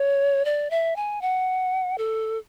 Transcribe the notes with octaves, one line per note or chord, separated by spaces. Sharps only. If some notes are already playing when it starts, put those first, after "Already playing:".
Already playing: C#5
D5
E5
G#5
F#5
A4